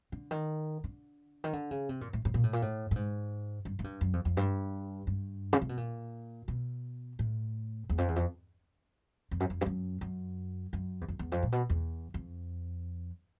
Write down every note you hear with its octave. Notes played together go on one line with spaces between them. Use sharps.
D3
D#3
D3
D#3
D3
C#3
C3
A#2
A2
A2
A#2
A2
A#2
A2
A2
G#2
G2
G#2
G2
F#2
F2
F2
G2
G2
C#3
C3
B2
A#2
B2
A2
E2
F2
E2
F2
F2
F#2
F2
G2
F#2
F#2
F#2
E2
F2
E2
F2
A#2
B2
E2
F2